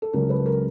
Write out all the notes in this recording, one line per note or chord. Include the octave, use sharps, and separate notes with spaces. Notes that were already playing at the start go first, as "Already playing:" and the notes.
A4
C#2 C#3 F#3 A#4
A4 B4
A#4